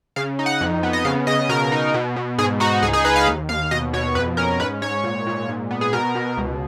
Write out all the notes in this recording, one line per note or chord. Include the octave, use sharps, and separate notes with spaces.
C#3 F5
D#4
F#5
F2
B3
D#5
C#3 F5
C#3 D#5
B2 A#4
D#4
B2
B2
G#2 G#4
D#4 F#4
C#2 G#4
G#4
D#4 B4
F5
D#2
D#2 F5
B2 D#5
B2 C#5
F2 B4
C#4 A#4
G#2 B4
G#2 C#5
A#2
A#2
G#2
B3
G#4
B2 A#4
B2
C#2